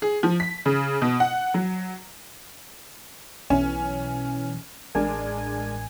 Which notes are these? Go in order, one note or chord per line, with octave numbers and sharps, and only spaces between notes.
G#4
F3
B6
C#3
B2
F#5
F#3
B1 E3 C#4
A1 G#3 D4 A#4 G#5